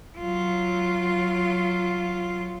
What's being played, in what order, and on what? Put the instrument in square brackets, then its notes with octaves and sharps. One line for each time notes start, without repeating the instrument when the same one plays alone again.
[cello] F#3 F4